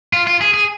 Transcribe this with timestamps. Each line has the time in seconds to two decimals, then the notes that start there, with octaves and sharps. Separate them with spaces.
0.13 F4
0.27 F4
0.41 G#4
0.54 G#4